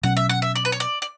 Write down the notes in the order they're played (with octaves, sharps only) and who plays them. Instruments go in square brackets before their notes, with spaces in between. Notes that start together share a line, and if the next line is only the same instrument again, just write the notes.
[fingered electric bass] B2 F#3 C#4 [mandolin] F#5
[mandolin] E5
F#5
E5
D5
B4
C#5
D5
D5